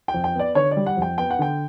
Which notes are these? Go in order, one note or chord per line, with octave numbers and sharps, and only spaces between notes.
G5
F2
G5
B3 D5
D3 C#5
D5
G3
F#5
F2
G5
B3 G5
F#5
D3 G5